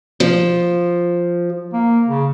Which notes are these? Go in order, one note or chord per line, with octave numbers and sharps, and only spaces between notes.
F3
A#3
C#3